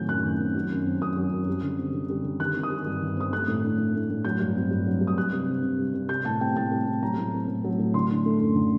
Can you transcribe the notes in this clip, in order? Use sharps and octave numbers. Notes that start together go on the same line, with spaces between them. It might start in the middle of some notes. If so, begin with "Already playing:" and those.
Already playing: A2 D#3 F#3 C4 G6
F#2 F#6
D#3
C4
F#3
F#2
C4
F#2 D#6
F#3
F#2
G3
D3
C4
D3
G3
D3
D#3 F#6
C4
D#6
G3
G2
D#3
C4 D#6
A3 F#6
A2
D4
A2
A3
A2
F#3 G6
G2
C4
G2
F#3
G2
D#6
G3 F#6
C3
C4
C3
G3
C3
G3 G6
A2 A5
C4 G5
A2 A5
G3
A2
F#3 A#5
A2
C4
A2
F#3
A2
D3 C6
D4
A3
F#2
D3